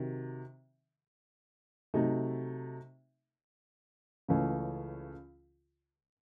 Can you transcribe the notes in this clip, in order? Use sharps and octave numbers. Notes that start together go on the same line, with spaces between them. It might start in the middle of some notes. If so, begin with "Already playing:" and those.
Already playing: C3 D#3 F#3
C3 F#3 A3 D#4
C#2 C#3 E3 A3 C#4